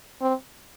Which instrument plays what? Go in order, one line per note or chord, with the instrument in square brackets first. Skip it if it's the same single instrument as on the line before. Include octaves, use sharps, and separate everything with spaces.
[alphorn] C4